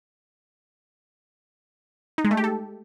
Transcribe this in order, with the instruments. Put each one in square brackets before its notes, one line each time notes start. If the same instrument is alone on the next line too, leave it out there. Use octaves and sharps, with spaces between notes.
[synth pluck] D#4
G#3
A3
G4
A4